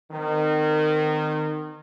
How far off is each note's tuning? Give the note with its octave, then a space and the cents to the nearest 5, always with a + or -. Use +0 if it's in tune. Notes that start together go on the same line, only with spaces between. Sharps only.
D#3 -25 C4 -45